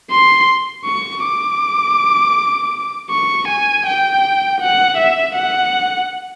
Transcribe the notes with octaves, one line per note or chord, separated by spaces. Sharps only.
C6
C#6
D6
C#6
G#5
G5
F#5
E5
F#5